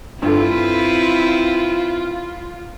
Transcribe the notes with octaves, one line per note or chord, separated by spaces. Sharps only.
G2 C4 E4 F4 A4 B4